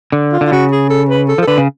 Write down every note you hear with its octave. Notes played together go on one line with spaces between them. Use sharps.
D3
F4
D3
F4
C#3 F#4
G#4
A4
B4
A4
F3
A4
D3 B4
C#3